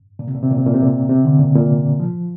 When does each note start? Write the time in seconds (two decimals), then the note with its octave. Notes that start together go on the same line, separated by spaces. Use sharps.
0.19 A#2
0.28 C3
0.35 A#2
0.43 C3
0.51 A#2
0.58 C3
0.66 A#2
0.74 C3
0.82 A#2
1.09 C3
1.25 D3
1.39 A#2
1.55 A#2
2.00 F3